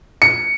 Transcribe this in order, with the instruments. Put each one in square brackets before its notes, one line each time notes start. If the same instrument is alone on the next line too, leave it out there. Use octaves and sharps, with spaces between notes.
[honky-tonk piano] C#7